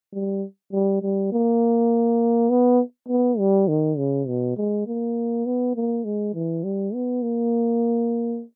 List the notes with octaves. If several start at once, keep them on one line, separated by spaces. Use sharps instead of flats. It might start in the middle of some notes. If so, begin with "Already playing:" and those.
G3
G3
G3
A#3
B3
B3
G3
D#3
C#3
B2
G#3
A#3
B3
A#3
G#3
E3
G3
B3
A#3